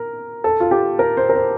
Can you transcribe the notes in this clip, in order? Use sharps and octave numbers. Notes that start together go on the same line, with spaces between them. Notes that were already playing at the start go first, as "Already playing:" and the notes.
Already playing: A#4
A4
F4
G4
A#4
C5
A#4
C5